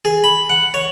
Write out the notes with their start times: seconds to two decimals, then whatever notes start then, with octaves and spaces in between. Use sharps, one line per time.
0.05 G#4
0.24 B5
0.50 F#5
0.74 C#5